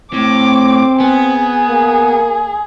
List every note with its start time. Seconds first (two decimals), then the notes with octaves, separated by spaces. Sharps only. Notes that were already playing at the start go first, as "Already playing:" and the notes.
0.13 A2 C4 D6
1.00 B3 G#4
1.68 A#3